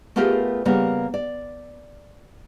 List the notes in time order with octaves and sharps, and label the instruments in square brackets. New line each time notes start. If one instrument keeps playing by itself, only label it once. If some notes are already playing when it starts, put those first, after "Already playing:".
[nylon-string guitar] A3 B3 F4 G4 G#4 A#4
C#3 G3 A#3 B3
D5